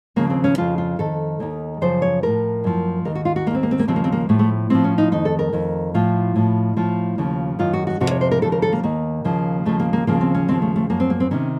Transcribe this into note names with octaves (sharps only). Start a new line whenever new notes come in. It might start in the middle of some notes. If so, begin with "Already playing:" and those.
D#2 C#3 F3 A#3
C4
C#4
F2 C#3 F3 F4
F4
F2 D#3 A4
D#2 D#3
F#2 C#3 F3 C5
C#5
A2 F3 A#4
F#2 F3
D#2 D#3 A#4
F#4
F4
F#4
D#2 D#3 A#3 C4
A#3
C4
A#3
D#2 C#3 F3 C4
A#3
C4
A#3
A2 F3 A3
A3
A2 F3 C4
C#4
D#4
F2 D#3 D#4
A4
A#4
F2 D#3
A2 F3 F4
A2 F3
A2 F3 F4
D#2 C#3 F3
F#2 D#3 F4
F#4
F#4
F2 C3 F3 F#4
C#5
C5
A#4
D#2 C#3 F3 A4
A#4
A4
A#3
D#2 D#3 A#3
D#2 C#3 F3
D#2 C#3 F3 A3
A#3
A#3
D#2 C#3 F3 A#3
C4
C#4
D#2 C#3 F3 C4
A3
A3
F#2 F3 A#3
C4
A#3
C4
C3 D#3 C#4